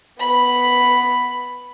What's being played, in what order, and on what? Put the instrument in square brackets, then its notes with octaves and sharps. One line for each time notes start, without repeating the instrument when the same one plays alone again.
[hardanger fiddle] B3 B5